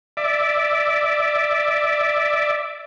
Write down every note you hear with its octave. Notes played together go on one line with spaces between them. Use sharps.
D5 E5